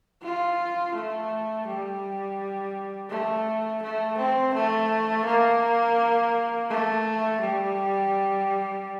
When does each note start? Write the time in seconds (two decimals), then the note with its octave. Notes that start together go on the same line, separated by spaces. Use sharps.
0.23 F4
0.95 A3
1.68 G3
3.10 A3
3.83 A3
4.18 C4
4.54 A3
5.25 A#3
6.70 A3
7.41 G3